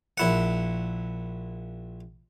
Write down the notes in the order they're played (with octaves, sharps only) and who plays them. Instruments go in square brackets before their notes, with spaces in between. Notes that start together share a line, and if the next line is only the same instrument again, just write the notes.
[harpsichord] A#1 E4 F#5